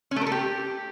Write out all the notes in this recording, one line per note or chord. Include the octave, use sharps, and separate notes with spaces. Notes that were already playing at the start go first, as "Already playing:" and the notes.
C#4
A3
A#4
A4
G4